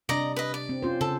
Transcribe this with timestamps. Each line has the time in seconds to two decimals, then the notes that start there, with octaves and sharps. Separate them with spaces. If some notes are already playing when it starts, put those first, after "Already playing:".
0.09 C3 D4 D5 D#5 A#5
0.36 B4 D#5
0.54 D5
0.69 C4
0.83 C#4 F4 C5
1.01 C#3 A4